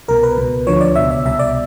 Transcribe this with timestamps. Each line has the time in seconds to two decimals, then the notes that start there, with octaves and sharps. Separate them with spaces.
0.08 C2 B2 A#4
0.23 B4
0.38 C#2 B2
0.67 D2 D3 F3 C#5
0.81 D5
0.96 C#2 B2 E5
1.11 E5
1.25 C2 B2 E5
1.39 D5